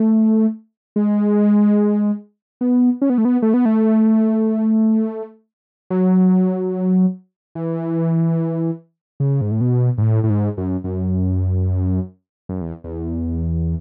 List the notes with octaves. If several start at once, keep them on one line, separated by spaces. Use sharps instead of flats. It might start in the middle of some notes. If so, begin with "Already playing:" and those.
Already playing: A3
G#3
B3
C#4
B3
A3
B3
A3
B3
A3
F#3
E3
C#3
G#2
A2
B2
G#2
A2
A2
G#2
F#2
F#2
F#2
E2
E2